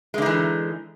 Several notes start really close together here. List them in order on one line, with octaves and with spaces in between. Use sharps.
G#3 D3 D#4 E3